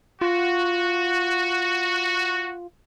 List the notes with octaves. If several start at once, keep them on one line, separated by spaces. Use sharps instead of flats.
F4 F#4